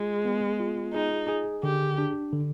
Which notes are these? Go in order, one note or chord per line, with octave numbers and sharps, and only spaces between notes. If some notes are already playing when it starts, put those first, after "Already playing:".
Already playing: G#3 F4 G#4
B3
F4
D#4 G#4
G#4
D3 G4
D4
D3